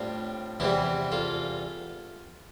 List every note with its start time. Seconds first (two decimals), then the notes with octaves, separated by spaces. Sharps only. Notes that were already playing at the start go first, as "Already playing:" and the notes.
Already playing: A2 G3 C4 D4 F4
0.60 E2 C3 E3 G3 E4 G4
1.12 F4 A4